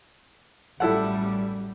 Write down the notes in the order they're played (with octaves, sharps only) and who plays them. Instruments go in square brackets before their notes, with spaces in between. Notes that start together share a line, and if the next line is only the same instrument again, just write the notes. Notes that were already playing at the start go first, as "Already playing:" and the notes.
[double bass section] A1 F#2 G3 [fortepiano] E4 A4 F#5